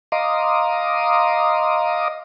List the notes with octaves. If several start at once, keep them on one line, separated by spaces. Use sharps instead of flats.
D#5 F5 A#5 C6 D6 D#6